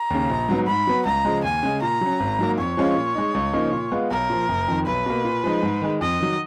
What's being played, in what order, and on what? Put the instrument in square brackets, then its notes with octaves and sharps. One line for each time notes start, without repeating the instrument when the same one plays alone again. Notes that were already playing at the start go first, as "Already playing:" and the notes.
Already playing: [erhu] A#5
[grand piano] D#2 C#3
A#1
G#2 F#3 B3
[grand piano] G#2 [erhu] B5
[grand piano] F#3 B3
[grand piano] C#2 [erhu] A#5
[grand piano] C#3 F3 G#3
[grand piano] D#2 [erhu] G#5
[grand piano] C#3 G#3
[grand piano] A#2 [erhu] A#5
[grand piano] F#3 C#4
G#1
G#2 F#3 A#3
[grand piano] F2 [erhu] C#5
[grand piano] F3 G#3 C#4 F4
A#2
G#3 D#4
C#2
C#3 F3 A#3 D#4
A#2
G#3 B3 F4
[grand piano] B1 [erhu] A#4
[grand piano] A#2 F3
F#1
F2 D#3
[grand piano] B1 [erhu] B4
[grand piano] B2 A#3
A#2
F3 G#3 D#4
G#2
D#3 G#3
[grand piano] F2 [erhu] D#5
[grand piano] D#3 F#3